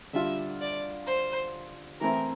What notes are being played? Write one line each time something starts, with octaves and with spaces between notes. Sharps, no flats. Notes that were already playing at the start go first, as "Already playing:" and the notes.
D3 G3 D4 F4 E5
D5
C5
E3 A3 C4 E4 A#4